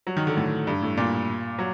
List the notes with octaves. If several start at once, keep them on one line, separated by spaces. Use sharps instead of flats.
F#3
D#3
D3
A2
G2
A2
A#2
F#3